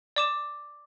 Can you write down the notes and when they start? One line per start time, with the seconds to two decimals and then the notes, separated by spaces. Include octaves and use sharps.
0.16 D5 D6 E7